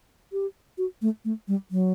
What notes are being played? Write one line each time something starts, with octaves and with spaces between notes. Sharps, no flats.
G4
F#4
A3
A3
G3
F#3